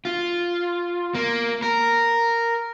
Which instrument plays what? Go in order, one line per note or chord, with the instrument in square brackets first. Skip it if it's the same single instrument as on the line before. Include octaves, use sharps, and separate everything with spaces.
[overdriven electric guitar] F4
A#3
A#4